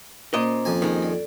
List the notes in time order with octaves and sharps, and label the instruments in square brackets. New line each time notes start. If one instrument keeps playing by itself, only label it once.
[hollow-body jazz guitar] A#2 D#5 [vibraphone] A#3 C#4 C5
[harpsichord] F2 G#5
[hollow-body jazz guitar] D#3 G#3
[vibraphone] A4 D5